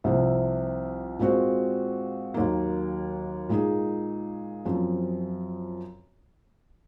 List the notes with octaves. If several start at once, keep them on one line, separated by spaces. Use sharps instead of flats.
C2 C3 F3 C4
A#2 G#3 C4 F#4
D#2 D#3 F#3 A#3
A#2 G#3 D#4 G#4
F#2 F3 C4